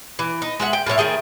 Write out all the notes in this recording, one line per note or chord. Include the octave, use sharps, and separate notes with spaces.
E3
D#4
G#3 E5 F#5
G5
A2 F3 C#5 E5
D#3 A3 G#4 G5